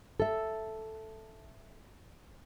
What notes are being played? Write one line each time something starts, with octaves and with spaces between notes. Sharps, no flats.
A4 E5